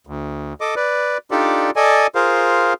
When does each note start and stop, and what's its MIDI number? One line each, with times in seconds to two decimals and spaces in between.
0.07 0.53 38
0.61 0.75 69
0.61 0.75 75
0.61 0.75 86
0.76 1.18 71
0.76 1.18 74
1.31 1.71 62
1.31 1.71 63
1.31 1.71 65
1.31 1.71 67
1.31 1.71 69
1.31 1.71 74
1.76 2.07 69
1.76 2.07 74
1.76 2.07 75
1.76 2.07 80
2.15 2.73 65
2.15 2.73 68
2.15 2.73 70
2.15 2.73 72
2.15 2.73 77